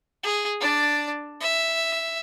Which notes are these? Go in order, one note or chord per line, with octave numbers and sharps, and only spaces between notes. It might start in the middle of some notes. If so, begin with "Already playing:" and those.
G#4
D4 D5
E5